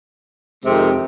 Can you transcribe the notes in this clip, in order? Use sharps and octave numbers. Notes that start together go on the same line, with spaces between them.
F2 C3 D#3 G#3 C4